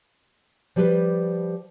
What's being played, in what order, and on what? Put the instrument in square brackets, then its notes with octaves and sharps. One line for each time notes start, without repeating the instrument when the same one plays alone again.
[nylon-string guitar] F3 G3 G4 G#4 B4 C5